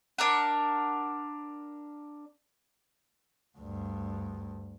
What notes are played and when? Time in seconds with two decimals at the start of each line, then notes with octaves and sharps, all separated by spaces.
0.18 D4 A#4 F#5
3.58 D2 G2